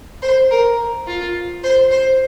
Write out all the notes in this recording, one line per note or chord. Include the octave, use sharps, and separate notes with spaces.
C5
A#4
F4
C5
C5